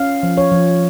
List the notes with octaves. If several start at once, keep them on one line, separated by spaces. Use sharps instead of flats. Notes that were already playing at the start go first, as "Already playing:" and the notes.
Already playing: C#4 F5
F3
C#5
F3